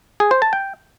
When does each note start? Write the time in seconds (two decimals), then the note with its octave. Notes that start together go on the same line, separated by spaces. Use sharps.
0.20 G#4
0.31 C5
0.42 A5
0.53 G5